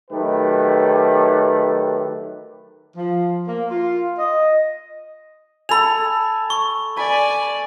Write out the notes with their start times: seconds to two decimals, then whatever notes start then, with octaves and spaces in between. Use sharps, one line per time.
0.11 D#3 F#3 A3 G4 B4
2.97 F3
3.47 A#3
3.71 F4
4.18 D#5
5.69 A4 G#5 B5 F7
6.50 C#6
6.97 D5 G#5 B5